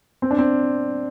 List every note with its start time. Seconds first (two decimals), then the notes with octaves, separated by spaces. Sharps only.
0.22 C4
0.31 D4
0.38 C4